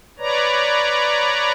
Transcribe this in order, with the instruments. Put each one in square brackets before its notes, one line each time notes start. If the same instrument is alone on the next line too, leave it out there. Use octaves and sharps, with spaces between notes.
[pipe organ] B4 C#5 D5 A#5